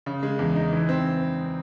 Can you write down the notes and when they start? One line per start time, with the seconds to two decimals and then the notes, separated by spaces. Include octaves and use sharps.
0.06 C#3
0.23 G#3
0.39 E2
0.55 D#4
0.73 E3
0.89 C4